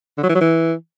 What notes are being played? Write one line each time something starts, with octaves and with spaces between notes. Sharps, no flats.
D3
F#3
E3
F#3
E3